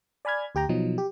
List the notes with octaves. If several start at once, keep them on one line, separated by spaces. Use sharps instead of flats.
D5 G#5 B5 F6 G#6
D2 G4 G5 A#5
B2 F3 F#3 D#4
G4